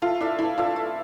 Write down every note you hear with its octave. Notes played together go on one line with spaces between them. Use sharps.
A3 F4
D4 E4 A4 E5
A3 E4
D4 F4 A4 E5
A3